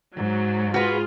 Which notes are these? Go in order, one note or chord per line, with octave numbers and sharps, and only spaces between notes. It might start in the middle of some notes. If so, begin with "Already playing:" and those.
G#2 F#3
F4 F#4 G#4 B4